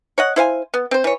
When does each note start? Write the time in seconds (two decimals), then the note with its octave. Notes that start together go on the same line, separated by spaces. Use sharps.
0.18 C#5 D#5 F#5
0.36 E4 C5 F5 G#5
0.74 B3
0.91 C4 C5
1.04 E3 C#5